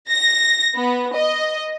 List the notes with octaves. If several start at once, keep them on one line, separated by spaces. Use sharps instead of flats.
A#6
B3
D#5